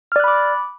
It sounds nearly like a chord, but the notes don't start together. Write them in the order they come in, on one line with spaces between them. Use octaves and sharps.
F6 D5 F#6 B5 D6